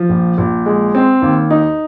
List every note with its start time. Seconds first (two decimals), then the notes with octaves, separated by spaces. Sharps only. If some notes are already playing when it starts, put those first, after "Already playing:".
Already playing: F3
0.09 A#1
0.38 A#1
0.66 G#3
0.95 C4
1.22 D#2
1.50 D#4